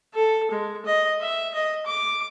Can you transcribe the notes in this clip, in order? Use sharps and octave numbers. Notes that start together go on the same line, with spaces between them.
A4
G#3
D#5
E5
D#5
D6